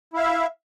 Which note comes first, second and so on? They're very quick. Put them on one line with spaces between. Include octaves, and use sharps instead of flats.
E4 F5 E5